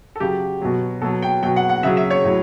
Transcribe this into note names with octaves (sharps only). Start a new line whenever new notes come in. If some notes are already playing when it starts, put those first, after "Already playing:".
A4
C#3 F#3 G4
B2 F#3
B2 F#3 A4
G5
B2 F#3 G5
F#5
F#5
C#3 F#3 E5
E5
C#5
A2 F#3